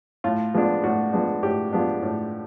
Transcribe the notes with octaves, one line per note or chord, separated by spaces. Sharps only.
A2 F4
F3 G#3 B3 D4
A2 F#4
F3 G#3 B3 D4
A2 G4
F3 G#3 B3 D4
A2